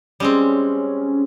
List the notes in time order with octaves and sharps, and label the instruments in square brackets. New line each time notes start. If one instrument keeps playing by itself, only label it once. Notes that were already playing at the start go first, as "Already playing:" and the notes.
[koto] G3 G#3 C4 [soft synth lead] C#4